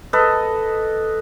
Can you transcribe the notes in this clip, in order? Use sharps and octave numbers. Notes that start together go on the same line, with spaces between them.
A4 B4 D#5